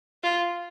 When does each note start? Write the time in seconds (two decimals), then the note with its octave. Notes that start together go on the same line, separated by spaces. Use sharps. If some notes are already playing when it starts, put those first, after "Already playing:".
0.23 F4